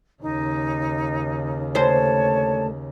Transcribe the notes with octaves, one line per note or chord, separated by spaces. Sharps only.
D#2 C#3 D#4
D2 C5 C#5 A5